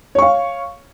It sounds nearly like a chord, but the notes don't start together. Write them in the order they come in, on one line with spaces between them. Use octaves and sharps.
C#5 C#6 F5